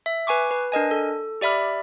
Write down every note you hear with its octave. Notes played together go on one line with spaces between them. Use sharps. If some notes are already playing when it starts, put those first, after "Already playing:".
E5
B4 G#5 C#6 D6
B4
D4 A#4 D#5 G#5
A4
G4 D5 E5 B5 F6